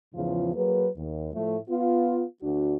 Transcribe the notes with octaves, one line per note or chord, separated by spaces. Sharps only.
E2 G#2 C#3 F3 F4
F#3 A#3 G#4 B4
D#2
A2 F3 A3
B3 F4
D2 D4 F#4